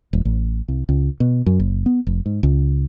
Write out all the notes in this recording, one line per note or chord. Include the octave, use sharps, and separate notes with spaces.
D#1
A1
C2
C#2
B2
F#2
F#1
B3
F1
G#2
C#2